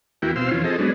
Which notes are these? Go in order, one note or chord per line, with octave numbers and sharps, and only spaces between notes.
E2 A#3 E4 F#4 G5
B2 C4 F5 C6 E6
F2 E3 C#4 F4
C4 G#4 A4 D#5
F#3 G#3 B3 C#4 D4